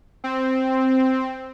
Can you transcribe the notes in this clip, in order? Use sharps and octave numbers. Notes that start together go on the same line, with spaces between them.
C4